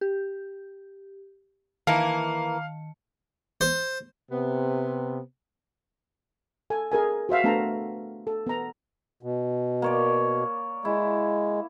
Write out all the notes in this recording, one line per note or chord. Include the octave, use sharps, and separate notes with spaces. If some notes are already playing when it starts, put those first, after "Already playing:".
G4
D#3 E3 A#3 F5 A5 C#7
C5
C3 B3
A4 G#5
G#4 A#4 G#5
F#4 C5 E5 F5
A3 B3 D4 F5 A5 A#5
A4
B3 A#5
B2
A#3 C#5 D5
G#3 E4